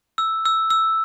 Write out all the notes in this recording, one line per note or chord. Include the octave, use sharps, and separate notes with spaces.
E6
E6
E6